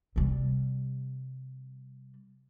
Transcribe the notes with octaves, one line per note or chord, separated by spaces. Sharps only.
C3 G3